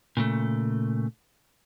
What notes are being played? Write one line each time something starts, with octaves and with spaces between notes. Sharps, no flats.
A#2 C#3 A3